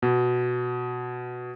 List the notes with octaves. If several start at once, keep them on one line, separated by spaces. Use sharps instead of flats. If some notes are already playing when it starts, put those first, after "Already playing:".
B2